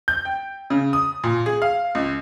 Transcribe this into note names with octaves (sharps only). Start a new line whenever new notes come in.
G6
G5
C#3
D#6
A#2
G#4
F5
C#2